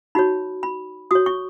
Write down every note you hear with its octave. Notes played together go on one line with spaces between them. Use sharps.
D#4 F#4 C#5 B5
B5
F#4 C#5 D#6
C#6